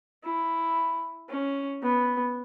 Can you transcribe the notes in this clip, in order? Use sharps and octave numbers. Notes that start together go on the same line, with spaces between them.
E4
C#4
B3